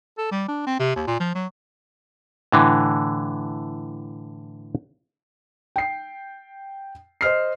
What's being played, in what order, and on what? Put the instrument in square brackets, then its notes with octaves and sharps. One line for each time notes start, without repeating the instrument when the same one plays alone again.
[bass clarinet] A4
G3
D4
C4
C3
D#2
A#2
F3
F#3
[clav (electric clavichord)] A2 D3 E3
[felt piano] G5 C7
C5 D#5 F6 C7